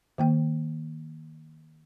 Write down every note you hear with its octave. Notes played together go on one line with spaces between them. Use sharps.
D#3 A#3 G5